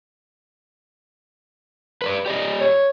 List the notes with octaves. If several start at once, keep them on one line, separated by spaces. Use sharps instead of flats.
B4 C5 D5
G4 D5 D#5
C#5